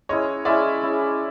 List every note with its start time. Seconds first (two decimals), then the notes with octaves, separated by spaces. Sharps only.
0.09 G#3 C#4 E4 G#4 C#5 D#5
0.45 G#3 C#4 E4 G#4 D5 E5
0.81 G#3 C#4 E4 G#4